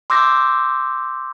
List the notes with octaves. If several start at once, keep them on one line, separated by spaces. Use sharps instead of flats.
C6 D6 E6 G6 A#6